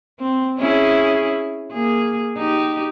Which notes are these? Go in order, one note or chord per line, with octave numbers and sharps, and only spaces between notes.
C4
C#4 E4 G#4
A#3 G#4
D#4 G4